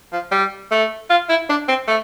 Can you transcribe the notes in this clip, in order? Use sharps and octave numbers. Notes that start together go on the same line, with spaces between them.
F3
G3
A3
F4
E4
D4
C4
A3